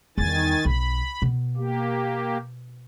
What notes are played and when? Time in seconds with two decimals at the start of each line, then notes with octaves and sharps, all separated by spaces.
0.18 E2 D#3 G3 G#5 A6
0.65 B1 B5
1.22 B2
1.57 A#3 G4